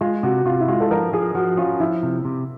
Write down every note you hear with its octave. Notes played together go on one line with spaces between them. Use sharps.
G#3 F4
C3 F#4
C3 F4
E4
G#3 F4
A4
F3 A#4
F3 G#4
F3 F#4
C#4 F4
F3 E4
C3
C3